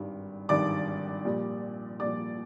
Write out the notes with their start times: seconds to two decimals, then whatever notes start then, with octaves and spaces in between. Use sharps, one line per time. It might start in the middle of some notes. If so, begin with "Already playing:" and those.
Already playing: G#1 G2 D#3 G3
0.49 G#1 G2 D#3 G3 D5 D6
1.25 A#1 A#2 G3
2.00 A#1 A#2 G3 D5 D6